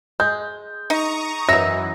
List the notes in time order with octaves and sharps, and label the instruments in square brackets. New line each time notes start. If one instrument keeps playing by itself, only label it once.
[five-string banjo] G#3 [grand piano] G6
[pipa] D#4 [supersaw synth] A#5 C#6 D#6
[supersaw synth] F#2 E3 [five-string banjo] F#3 D#4 [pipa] E5 [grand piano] A#6